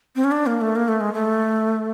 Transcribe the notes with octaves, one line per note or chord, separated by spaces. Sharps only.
C4
C#4
D4
A#3
A3
A#3
A3
G#3
A3